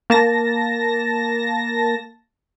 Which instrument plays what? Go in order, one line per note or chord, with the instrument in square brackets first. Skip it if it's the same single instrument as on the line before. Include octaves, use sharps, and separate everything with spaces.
[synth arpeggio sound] A#3 A5 A#6